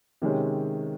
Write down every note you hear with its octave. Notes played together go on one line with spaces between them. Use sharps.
C3 D#3 G#3 C#4